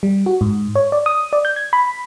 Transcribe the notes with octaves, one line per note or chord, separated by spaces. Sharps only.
G3
F#4
G#2
C#5
D5
D#6
D5
G6
G#6
B5